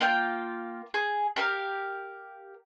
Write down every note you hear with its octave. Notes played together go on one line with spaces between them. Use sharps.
A#3 F4 F5 G5
G#4
G4 A#4 F5